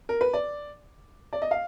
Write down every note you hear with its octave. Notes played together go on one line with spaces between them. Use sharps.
A#4
B4
D5
D5
D#5
F5